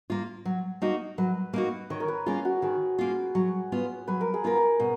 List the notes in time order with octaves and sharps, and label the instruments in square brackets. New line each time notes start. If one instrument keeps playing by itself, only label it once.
[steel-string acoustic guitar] A#3 F4
F#3
A#3 D#4 F#4
[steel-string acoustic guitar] F#3 [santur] B4
[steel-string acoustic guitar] A#3 D#4 F#4
[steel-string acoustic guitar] D#3 [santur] C#5
[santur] A#4
B4
[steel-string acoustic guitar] A#3 C#4 F4 [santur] G#4
[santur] F#4
[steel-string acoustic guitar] D#3 [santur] G#4
[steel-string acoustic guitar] A#3 C#4 F4
F#3
B3 F4
[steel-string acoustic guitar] F#3 [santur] B4
[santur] A#4
G#4
[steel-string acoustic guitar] B3 F4 [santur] A#4
[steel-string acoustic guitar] B2